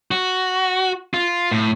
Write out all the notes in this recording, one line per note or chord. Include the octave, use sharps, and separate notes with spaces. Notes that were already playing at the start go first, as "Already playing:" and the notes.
F#4
F4
A2